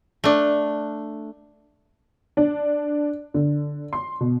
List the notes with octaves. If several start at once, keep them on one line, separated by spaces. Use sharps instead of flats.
A3 D4
D4
D3
C6
B2